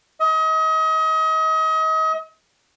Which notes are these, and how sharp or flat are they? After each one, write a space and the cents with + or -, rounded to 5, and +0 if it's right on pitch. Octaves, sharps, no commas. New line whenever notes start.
D#5 +35